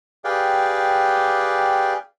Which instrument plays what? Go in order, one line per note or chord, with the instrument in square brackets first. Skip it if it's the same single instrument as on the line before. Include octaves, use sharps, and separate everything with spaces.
[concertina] G4 G#4 B4 D5 F5 G5